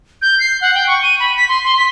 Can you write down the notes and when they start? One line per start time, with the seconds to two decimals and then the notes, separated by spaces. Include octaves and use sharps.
0.22 G6
0.40 C7
0.61 F#5
0.74 G5
0.87 C#6
1.03 D#7
1.20 B5
1.36 B6
1.49 C6
1.63 C6
1.78 B6